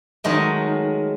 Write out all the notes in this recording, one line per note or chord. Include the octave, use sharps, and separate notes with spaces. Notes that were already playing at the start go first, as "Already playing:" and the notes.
D#3 F#3 G#3 A3